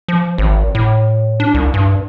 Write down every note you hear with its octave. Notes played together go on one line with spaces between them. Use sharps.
F3
G#1
A2
D4
C2
G2